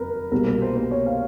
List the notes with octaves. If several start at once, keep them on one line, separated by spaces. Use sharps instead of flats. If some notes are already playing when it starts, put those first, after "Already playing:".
Already playing: F#1 F2 A#4 B4
C2 B2 G3 A#3 A#4
A#4
C5
C5
C#5
F5